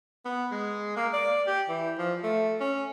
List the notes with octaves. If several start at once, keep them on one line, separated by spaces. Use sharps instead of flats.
B3
G#3
A#3
D5
G4
E3
F3
A3
C#4